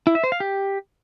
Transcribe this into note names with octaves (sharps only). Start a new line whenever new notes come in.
E4
E5
C5
F5
G4